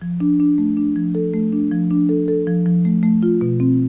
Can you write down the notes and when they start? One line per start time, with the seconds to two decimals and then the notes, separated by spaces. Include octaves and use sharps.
0.02 F3
0.20 D4
0.40 D4
0.58 A3
0.77 D4
0.96 F3
1.15 A4
1.34 A3
1.53 D4
1.71 F3
1.91 D4
2.09 A4
2.28 A4
2.47 F3
2.66 F3
2.85 A3
3.03 A3
3.23 F4
3.41 B2
3.60 C4